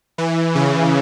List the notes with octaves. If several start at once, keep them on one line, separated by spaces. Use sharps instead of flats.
E3
C#3